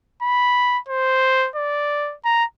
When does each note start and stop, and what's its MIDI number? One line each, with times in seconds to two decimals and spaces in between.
0.23 0.79 83
0.89 1.48 72
1.56 2.15 74
2.25 2.44 82